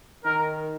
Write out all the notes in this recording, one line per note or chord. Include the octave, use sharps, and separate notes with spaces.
D#3 A#4